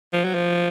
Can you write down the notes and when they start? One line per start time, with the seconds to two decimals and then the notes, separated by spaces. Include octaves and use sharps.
0.13 F3
0.24 F#3
0.34 F3